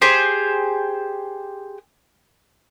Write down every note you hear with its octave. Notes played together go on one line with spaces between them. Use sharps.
G4 G#4 C5